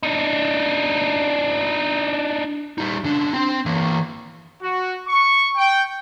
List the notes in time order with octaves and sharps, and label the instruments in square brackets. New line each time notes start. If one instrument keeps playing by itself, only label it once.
[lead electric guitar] D4 D#4
G3 D#4
C#3 D4
C4 G5
E3 A#3
[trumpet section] F#4
C#6
G5